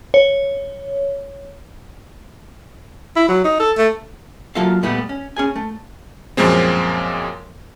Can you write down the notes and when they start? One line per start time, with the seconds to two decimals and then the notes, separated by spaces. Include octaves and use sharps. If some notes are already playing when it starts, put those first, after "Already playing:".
0.14 C#5
3.16 E4
3.29 F#3
3.44 D#4
3.60 A4
3.78 A3
4.55 F#3 A#3 F4 A4 E5 F5
4.83 A#2 G3 A3 B3 G4
5.09 C#4
5.36 C#4 G#4 G#5
5.56 A3
6.37 F#2 A#2 F3 G#3 C4